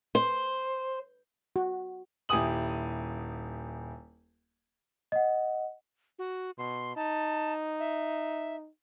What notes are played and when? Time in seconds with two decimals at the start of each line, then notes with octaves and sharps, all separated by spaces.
0.15 C5
1.56 F#4
2.29 D#1 E4 G4 G#5 D#6 F#7
5.12 D#5 F#5
6.19 F#4
6.58 B2 C6
6.96 D#4 A5
7.80 E5